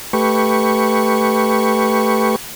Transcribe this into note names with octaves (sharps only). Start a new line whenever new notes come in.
A3 G4 B4 C#6